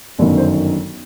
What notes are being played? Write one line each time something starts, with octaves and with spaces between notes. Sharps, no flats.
G1 F#2 D#3 F#3
C5